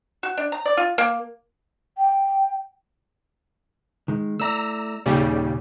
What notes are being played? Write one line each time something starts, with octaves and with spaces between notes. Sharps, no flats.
F#4
D4
A#5
D5
F4
A#3
G5
D#3 G#3
A3 E4 D5 A#5 E6
D#2 A#2 C#3 G3